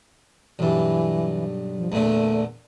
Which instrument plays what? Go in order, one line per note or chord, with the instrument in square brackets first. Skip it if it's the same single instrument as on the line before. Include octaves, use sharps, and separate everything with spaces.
[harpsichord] B1 G2 [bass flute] E3
[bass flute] F3
[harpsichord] E2 A#2 D3 [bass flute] A3